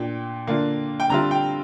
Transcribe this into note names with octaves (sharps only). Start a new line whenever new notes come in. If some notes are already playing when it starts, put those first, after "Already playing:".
Already playing: A#2 A#3 D4 G5
D3 A#3 D4 F4
G5
D3 G3 C4 F4 A#5
G5